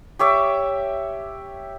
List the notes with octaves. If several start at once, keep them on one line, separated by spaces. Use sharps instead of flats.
G4 C#5 E5 D6